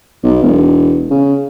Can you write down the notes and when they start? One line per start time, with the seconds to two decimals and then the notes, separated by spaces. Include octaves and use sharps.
0.24 B1
0.43 E1
1.10 C#3